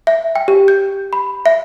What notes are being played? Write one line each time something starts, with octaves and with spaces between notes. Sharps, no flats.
E5
G5
G4
G6
B5
E5